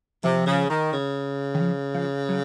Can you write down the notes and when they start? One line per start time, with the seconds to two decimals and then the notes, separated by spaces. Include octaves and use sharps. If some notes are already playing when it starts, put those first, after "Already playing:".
0.24 C3 F3
0.46 C#3
0.69 D#3
0.92 C#3
1.55 D#3
1.60 F3
1.94 F3
2.29 F#3